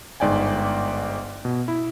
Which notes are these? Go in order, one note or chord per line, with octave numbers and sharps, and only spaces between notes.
G1 G#2 D5 G5 G#5
B2
E4